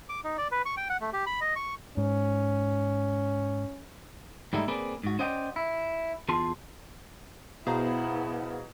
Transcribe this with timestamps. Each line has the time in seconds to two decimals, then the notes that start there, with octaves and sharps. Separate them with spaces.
0.09 D6
0.24 D#4
0.38 D5
0.52 B4
0.66 C#6
0.77 G5
0.90 F#5
1.01 A3
1.13 G4
1.26 B5
1.41 D#5
1.56 C#6
1.97 G#2 C#4
4.53 G#2 G3 A3 D#4 E4
4.68 A#3 C4 G#4 B4 D5
5.03 G#2 F#4
5.19 C#4 C5 D5 D#5 F#5 G5
5.56 E4
6.29 E2 F4 G#4 A5 C6
7.67 B2 B3 E4 G#4 C5 F5 A#5